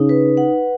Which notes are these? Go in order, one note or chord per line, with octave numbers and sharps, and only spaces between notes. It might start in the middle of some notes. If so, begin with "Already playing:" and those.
Already playing: C#3 D#4
B4
F#5